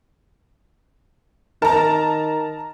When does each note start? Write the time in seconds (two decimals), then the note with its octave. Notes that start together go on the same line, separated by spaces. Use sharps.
1.62 D#3 A#4 A5 A#5